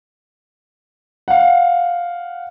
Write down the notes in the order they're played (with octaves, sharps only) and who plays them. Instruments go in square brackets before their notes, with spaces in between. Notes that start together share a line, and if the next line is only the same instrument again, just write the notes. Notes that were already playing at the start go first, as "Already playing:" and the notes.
[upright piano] F5 F#5